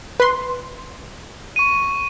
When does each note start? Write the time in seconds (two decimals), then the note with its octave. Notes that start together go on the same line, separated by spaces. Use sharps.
0.20 B4 C6
1.56 C#6 D#7